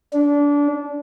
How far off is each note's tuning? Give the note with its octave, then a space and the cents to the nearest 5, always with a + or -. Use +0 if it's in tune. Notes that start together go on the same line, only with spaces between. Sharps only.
D4 -25